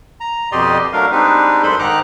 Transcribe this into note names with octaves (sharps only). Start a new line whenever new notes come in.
A#5
F2 B2 G4 D5 D#5 C6
F#3 A3 D4 A#4 F5
G3 G#3 C4 D4 D#4 B4
F#2 G#3 A4 C5 B5 C6
G#2 D#3 D#4 A#5 D6 F#6